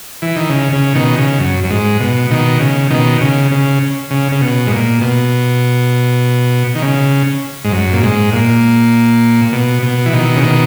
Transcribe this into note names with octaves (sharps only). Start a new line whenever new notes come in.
E3
D#3
C#3
C#3
B2 D#3
C#3
F#2
F#2
G#2
B2
B2 D#3
C#3
B2 D#3
C#3
C#3
C#3
C#3
B2
G#2
A#2
B2
D#3
C#3
G#2
F#2
A#2
G#2
A#2
B2
B2
E3
B2 D#3
C#3
B2 D#3